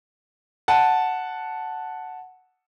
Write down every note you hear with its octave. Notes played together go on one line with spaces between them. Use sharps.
F#5 A5